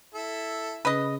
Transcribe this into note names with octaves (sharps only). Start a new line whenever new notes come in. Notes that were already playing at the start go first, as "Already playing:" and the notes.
E4 A4
C#3 B4 D#5